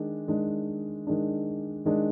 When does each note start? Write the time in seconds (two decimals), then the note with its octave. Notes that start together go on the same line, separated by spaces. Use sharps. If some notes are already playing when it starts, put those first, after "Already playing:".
Already playing: D#3 G#3 D4
0.28 D#3 G#3 D4
1.07 D#3 G#3 D4
1.85 D#3 G#3 D4